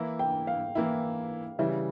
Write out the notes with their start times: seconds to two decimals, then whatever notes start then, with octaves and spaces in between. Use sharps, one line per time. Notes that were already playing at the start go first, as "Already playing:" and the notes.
Already playing: E3 A#3 E4
0.19 G5
0.47 F5
0.75 E3 A#3 E4
1.59 C#3 E3 G3 E5